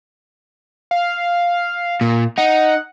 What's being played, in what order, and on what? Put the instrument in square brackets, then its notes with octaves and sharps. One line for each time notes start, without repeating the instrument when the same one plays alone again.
[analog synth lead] F5
[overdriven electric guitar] A#2
[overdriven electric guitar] D#4 [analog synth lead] F#5